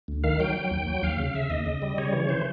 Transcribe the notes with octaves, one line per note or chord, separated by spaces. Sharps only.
D2
D#3 F5
F#3 G5
F#3
D#2
F#3
D#2 F5
C#3
C#3 E5
D#2 D#5
C#3
G3
C#3 C#5
E3
E3 C5